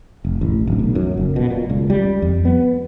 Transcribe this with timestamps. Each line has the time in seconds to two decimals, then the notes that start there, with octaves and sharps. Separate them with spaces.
0.25 F1
0.41 A1
0.67 D1
0.79 B1
0.95 F#2
1.17 F#1
1.36 B2
1.51 A#2
1.70 C#2
1.90 G3
2.22 F2
2.45 B3